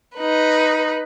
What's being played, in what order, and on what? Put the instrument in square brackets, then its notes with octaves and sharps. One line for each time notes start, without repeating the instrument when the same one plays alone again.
[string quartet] D#4 B4